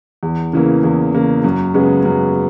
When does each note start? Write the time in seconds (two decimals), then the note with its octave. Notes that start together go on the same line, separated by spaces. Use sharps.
0.23 E2
0.53 C#3 E3 A#3
0.84 E2
1.14 C#3 E3 A#3
1.44 F#2
1.74 C#3 G#3 B3
2.05 F#2